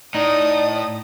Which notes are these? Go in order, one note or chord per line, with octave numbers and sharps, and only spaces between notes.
A2 D#4 D5 D#6